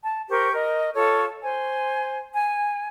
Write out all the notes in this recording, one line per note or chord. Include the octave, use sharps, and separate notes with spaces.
A5
G4 A#4 C5 C#6
A#4 D#5
F4 A4 C#5 C#6
C5 G#5
G#5